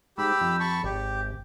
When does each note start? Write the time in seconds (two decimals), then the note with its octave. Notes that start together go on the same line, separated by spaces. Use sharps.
0.18 G#2 G4 B5 E6
0.41 F2
0.60 A5 B5 C#6
0.84 G#1 G4